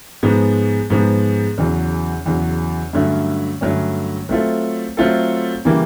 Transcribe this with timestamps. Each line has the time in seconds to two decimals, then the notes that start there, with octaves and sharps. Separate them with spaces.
0.23 G#2 F3 G#3 B3
0.90 G#2 F3 G#3 B3
1.58 E2 C#3 F#3
2.26 E2 C#3 F#3
2.93 G2 D3 F#3 A3 C#4
3.61 G2 D3 F#3 A3 C#4
4.29 F#3 A3 C4 F4 A4
4.97 F#3 A3 C4 F4 A4
5.65 C#3 E3 G3 A#3